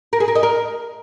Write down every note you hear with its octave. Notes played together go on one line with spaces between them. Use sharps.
A#4
G#4
A#4
D#5
A#4